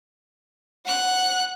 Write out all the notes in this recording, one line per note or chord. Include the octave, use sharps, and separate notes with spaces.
F#5 F#6